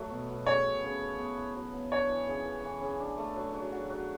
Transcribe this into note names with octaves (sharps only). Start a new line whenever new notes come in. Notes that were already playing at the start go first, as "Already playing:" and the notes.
Already playing: F#3 A3
B2
B2
C#3 C#5
B3
C#3
C#3
B3
E4
F#3
B3
D4 C#5
E3
C#3
E3
E3
C#3
D4
A3
F#3
F#3
F#4
F#3